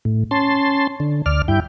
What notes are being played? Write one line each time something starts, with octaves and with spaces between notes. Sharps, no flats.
A2
C#4 A5 C6
D3
D2 D5 F6
G2 E4 G5